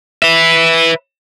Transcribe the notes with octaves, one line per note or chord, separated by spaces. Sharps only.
B4 E5